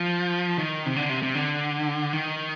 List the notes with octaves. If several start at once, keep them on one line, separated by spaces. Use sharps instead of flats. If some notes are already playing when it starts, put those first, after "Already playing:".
Already playing: F3
D#3
C3
D3
C3
C3
D3
D#3